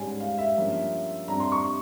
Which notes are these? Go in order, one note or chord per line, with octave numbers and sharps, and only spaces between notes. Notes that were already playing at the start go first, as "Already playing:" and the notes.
Already playing: G#2 G3 C#4 G#5
F5
E5
G2 F3 A#3 C#4
G2 G3 C4 A#5
C6
C#6